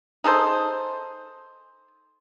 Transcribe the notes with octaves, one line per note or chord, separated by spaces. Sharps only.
D#4 G#4 A4 C5